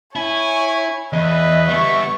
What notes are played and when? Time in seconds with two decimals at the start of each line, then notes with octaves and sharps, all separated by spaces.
0.16 E4 C#5 G#5
1.13 E2 B4 D#5 E5
1.68 G3 B3 E5 C#6